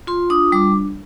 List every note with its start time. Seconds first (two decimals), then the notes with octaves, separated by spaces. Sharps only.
0.07 F4 C6
0.30 D4 D#6
0.52 G3 D6